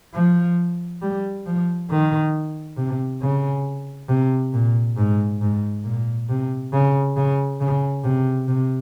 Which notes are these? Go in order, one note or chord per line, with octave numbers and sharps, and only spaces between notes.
F3
G3
F3
D#3
C3
C#3
C3
A#2
G#2
G#2
A#2
C3
C#3
C#3
C#3
C3
C3